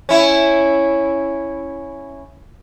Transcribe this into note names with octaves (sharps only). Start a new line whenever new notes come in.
C#4 E4